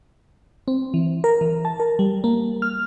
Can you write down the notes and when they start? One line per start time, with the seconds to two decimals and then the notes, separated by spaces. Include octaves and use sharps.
0.68 C4
0.94 E3
1.24 A#4
1.41 E3
1.65 A5
1.80 A#4
1.99 G3
2.24 A#3
2.62 F6